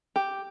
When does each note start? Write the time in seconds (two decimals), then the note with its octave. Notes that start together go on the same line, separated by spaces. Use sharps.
0.16 G4